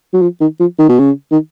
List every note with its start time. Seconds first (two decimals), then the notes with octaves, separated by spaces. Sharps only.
0.14 F#3
0.22 F3
0.41 D#3
0.60 F3
0.79 D#3
0.89 B2
0.99 C#3
1.31 D#3